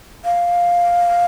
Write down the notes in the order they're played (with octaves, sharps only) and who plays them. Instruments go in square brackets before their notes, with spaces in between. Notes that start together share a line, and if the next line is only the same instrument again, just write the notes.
[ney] F5